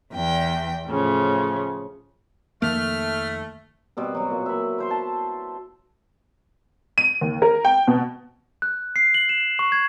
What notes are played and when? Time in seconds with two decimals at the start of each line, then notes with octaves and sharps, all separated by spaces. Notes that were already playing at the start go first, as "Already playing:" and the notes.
0.13 E2 G5
0.88 A2 C#3 F3
2.62 F2 D#3 F3 A3 A#3 F6
3.97 B2 G3 C4
4.15 F#3 F#4
4.31 A#2
4.46 E5 B5
4.78 E4 C5 C6
4.91 A5
6.98 D#7
7.21 D#2
7.42 A#4
7.65 G5
7.88 B2
8.62 F#6
8.96 C7
9.14 F#7
9.29 E7
9.59 C#6
9.72 G#6